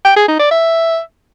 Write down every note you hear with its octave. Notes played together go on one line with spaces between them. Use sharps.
G5
G#4
D#4
D5
E5